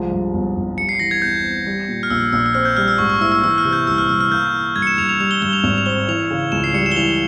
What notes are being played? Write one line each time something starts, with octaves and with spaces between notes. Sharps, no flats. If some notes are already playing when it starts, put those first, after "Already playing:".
Already playing: C2 F3 G#3
G2
G1
G1
G3 C#7
C7
E3 A#6
G#6
E2 G6
C4
G3
A#2
F6
A#1 E6
A#1 E6
E6
C4 F6
G6
G3 F6
E6
G#2 C#6
C#6
E4 E6
E6
E3 E6
F6
C3
G6
C2 E6
F6
C2 E6
F6
A#3 G6
E3
G2 G#6
C#7
E7
G2 F7
F7
G3 F7
G7
G2 G7
F7
G#1 F7
F7
C4 G7
E3 F7
C#3
C#2 E7
C7
G3 C#7
E7
G7
E3 F7